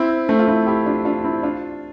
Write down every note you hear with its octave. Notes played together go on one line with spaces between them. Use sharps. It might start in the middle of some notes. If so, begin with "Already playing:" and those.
Already playing: C4 E4
A3 C4
F4
C4 E4
E4 G4
D4 F4
D4 F4
C4 E4
D4 F4